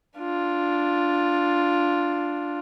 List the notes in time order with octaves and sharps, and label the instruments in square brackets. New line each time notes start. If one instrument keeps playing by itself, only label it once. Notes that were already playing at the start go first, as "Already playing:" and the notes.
[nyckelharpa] D4 F4